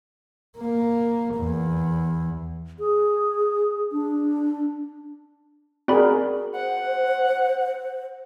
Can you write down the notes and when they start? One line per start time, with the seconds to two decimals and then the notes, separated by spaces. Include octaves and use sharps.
0.59 A#3
1.36 E2
2.79 G#4
3.92 D4
5.88 C4 F#4 G#4 A#4 D5 B5
6.55 C5 F#5